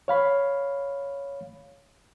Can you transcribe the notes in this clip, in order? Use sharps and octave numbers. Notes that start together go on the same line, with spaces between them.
C#5 F5 B5